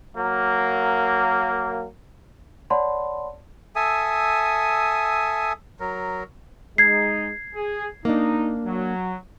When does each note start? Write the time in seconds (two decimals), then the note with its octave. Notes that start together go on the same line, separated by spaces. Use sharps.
0.17 F#3 A#3
2.70 C#5 D5 F#5 A5 B5 C6
3.76 A4 E5 G#5 D#6
5.80 F#3 A#4
6.78 G#3 D#4 G#6 C7
7.55 G#4
8.05 A#3 D4 D#4
8.66 F#3